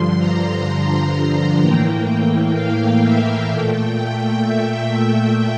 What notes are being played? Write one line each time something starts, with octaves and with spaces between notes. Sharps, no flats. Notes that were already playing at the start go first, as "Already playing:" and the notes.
Already playing: G2 D3 F3 C6
A#5
A2 E3 A#3 G5
F5
E5
A#2 A3 G5
G5
E5